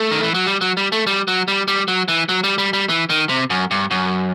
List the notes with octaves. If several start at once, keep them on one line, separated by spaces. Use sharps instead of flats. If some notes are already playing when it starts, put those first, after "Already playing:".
Already playing: A3
D#3
E3
F#3
G3
F#3
G3
A3
G3
F#3
G3
G3
F#3
E3
F#3
G3
G3
G3
E3
D#3
C3
F#2
G2
F#2